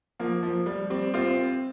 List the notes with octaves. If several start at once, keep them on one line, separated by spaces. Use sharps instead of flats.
F3 A#3
F3
G3
G3 C4
C4 F4